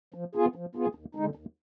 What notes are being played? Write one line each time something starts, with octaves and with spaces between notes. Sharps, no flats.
F3
B3 F4 G#4
F3
B3 F4 G#4
D#2
D3 G#3 D#4
D#2